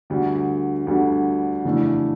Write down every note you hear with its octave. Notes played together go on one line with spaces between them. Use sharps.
D2 D3 G3
D2 D3 G3
F2 C#3 E3 A3 D4